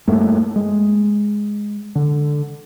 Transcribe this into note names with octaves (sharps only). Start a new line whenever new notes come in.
G2 A3 A#3
G#3
D3